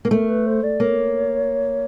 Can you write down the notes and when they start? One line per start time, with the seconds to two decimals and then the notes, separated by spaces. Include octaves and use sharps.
0.05 A#3
0.11 A3 A#4
0.29 B4
0.46 C5
0.63 D5
0.80 A#3 C#5